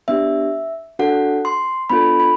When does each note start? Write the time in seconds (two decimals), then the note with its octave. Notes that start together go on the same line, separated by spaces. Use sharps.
0.08 B3 D4 G4 E5
0.99 D4 F#4 A4 F#5
1.45 C6
1.90 B3 D4 F4 A4 B5
2.20 B5